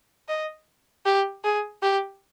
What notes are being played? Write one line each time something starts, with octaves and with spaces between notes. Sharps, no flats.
D#5
G4
G#4
G4